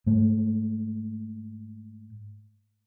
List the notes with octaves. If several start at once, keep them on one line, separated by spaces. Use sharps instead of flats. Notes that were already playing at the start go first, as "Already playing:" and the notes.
G#2 A3